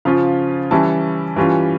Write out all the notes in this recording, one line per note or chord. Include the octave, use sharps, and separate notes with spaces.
C#3 F3 C#4 F4 F5
E3 G3 C#4 E4 A5
E3 G3 C#4 F4